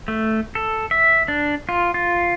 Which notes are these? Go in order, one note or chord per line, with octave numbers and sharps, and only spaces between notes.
A3
A4
E5
D4
F4
F4